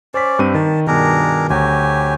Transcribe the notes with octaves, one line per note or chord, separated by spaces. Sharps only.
C#4 C5 D5 B6
G2 C4 D#7
D#3 A5
G2 B2 D#3 D4 G#4 A#4
D2 F#3 G4 G#5